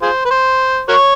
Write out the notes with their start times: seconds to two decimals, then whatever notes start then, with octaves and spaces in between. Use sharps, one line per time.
0.02 F4 G#4 C5
0.25 B4
0.31 C5
0.89 F#4 A#4 C#5